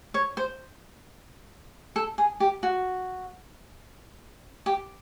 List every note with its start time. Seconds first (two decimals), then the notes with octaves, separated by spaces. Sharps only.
0.14 C#5
0.37 C5
1.96 A4
2.18 G#4
2.40 G4
2.63 F#4
4.66 G4